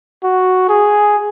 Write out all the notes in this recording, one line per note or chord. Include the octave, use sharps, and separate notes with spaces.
F#4
G#4